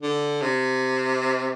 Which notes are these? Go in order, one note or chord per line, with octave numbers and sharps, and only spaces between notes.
D3
C3